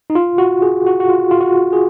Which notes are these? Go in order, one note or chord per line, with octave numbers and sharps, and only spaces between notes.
D#4
F4
F#4
G#4
F#4
F#4
F4
F4
F#4
G#4